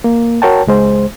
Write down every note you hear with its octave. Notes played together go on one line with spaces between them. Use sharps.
A#3
F#4 A#4 C#5 G5 A5
C#2 G#3 C5